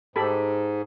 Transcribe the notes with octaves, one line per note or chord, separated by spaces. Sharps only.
G#2 G4 A4 B5